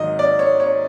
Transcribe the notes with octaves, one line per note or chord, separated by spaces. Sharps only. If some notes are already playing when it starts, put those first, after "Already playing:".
Already playing: G#2 D#3 F#3 D#5
D5
C#5
C#5